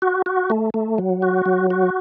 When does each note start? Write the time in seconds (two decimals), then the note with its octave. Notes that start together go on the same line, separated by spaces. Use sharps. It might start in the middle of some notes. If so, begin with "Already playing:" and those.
0.02 F#4
0.26 F#4
0.50 A3
0.74 A3
0.98 F#3
1.22 F#4
1.46 F#3
1.70 F#4